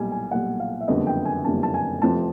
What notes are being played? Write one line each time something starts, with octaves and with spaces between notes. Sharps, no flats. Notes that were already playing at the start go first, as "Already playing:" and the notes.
Already playing: B1 A#2 G3 G#5
G#5
B1 A#2 G3 F#5
F5
E5
F#1 F2 D3 G3 B3 D#5
G5
G#5
F#1 F2 D3 G3 B3 A5
A5
G#5
F1 F2 C3 F3 A5